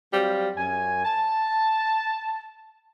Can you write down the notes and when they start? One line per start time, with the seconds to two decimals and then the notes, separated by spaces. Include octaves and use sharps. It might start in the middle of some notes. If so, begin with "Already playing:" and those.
0.12 F#3 G3 C4 F#4 F5
0.56 F#2 G#5
1.04 A5